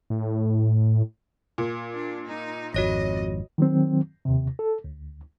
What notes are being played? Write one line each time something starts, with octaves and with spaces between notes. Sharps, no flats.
A2
A#2
D4
D#4
G#1 F2 F#4 C#5 D#5 A#6
D#3 F#3 C4
D#2 C3
A4
D2